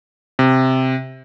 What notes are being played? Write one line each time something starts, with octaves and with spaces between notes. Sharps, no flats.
C3